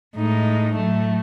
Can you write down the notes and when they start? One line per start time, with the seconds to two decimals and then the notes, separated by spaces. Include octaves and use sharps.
0.16 A2 G#3 D#4
0.75 A2 F#3 A3